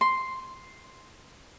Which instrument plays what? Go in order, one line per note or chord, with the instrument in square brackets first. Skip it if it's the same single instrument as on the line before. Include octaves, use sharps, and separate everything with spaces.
[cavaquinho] C6